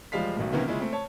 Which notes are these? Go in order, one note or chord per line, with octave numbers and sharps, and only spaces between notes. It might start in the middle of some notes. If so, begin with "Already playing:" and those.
E1 F3 G3 G#3 F5 B6
B1 B2 D#3 A3
C3 D#3 E3 A#3 B3 C#4
C#3 G#3 C#4 E4 F4
A3 C4
C#5 A5